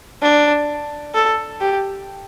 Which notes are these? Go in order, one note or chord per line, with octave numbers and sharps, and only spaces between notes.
D4
A4
G4